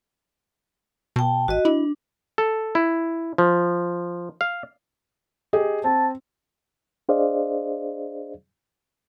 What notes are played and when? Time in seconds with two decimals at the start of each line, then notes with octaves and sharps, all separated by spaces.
1.16 B2 G5 A5
1.48 A1 F#4 D#5
1.65 D4 E4
2.38 A4
2.75 E4
3.38 F3
4.41 F5
5.53 G4 G#4 D#5
5.84 C4 A5
7.09 D4 G#4 C5 D5 D#5 F5